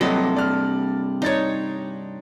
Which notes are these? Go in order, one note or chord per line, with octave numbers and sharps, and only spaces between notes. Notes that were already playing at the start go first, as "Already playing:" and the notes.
G2 C3 F#3 A4 D#5
D5 F6
D4 D#4 C#5 A6